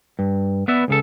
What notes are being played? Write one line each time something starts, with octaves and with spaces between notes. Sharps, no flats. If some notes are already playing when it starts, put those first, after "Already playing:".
G2
B3 B4 D5 E5
C#2 C#3 A4